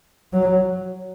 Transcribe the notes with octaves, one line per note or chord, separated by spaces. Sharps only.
F#3